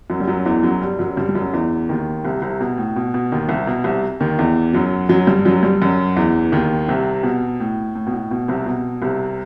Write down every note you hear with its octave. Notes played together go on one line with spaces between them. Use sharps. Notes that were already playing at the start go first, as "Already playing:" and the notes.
F#2 F#3
G3
F#2 F#3
E2 E3
F#2 F#3
G2 G3
F#2 F#3
G2 G3
G3
F#2 F#3
E2 E3
D#2 D#3
C2 C3
C2 C3
B2
A2
B2
B2
D#2 D#3
C2 C3
B2
C2 C3
D#2 D#3
E2 E3
F#2 F#3
F#2 F#3
G2 G3
F#2 F#3
G2 G3
F#2 F#3
E2 E3
E3
D#2 D#3
C2 C3
B2
A2
A2
B2
A2
B2
C2 C3
B2
C2 C3